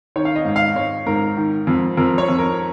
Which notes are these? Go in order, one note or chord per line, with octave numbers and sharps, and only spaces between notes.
D#3 C#5
F5
D#5
G#2
F5
G#2 C#5
G#2 A#4
D#3
F2
F2 A#4
C#5
F2
A#4